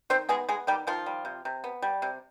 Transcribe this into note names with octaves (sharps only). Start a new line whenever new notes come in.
D#3 C4 C5
G#3 B3 G#4
G#3 B3 G#4
D#3 G3 G4
D#3 F3 F4
G3
C3
C3
B3
G3
C3